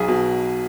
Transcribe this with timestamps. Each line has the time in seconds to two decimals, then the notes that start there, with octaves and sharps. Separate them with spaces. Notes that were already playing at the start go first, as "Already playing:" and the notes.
Already playing: B1 G#4
0.08 B2